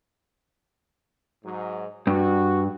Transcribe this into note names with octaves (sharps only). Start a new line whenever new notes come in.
G#2 F#3
G2 F#4